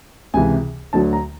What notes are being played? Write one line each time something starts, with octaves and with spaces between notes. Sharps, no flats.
C#2 C3 E3 G#5
D2 D3 F#3 A5
A#5